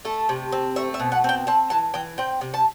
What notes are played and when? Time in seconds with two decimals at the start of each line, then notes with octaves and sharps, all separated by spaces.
0.05 A3 A4
0.29 C3
0.52 C4
0.76 A3 E5
0.94 E5
1.00 B2
1.12 F#5
1.24 C4 G5
1.47 C4 A5
1.70 E3 A5
1.94 E3 G5
2.18 C4 G5
2.41 C3
2.54 A5